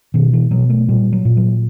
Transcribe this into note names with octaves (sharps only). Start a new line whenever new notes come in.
B2 D#3
E3
B2 F#3
A3
A#2 G3
F#3
A#2
F#3